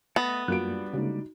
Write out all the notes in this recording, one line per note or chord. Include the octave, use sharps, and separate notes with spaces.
A3 B3 D#5 A5
F#2 G3 A#3 D4 F4 F#4 F#6 D7
C#3 G#3 A#3 D#4 F#4